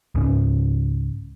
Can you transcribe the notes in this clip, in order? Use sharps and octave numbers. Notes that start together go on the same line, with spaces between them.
C#2 G#2 C#4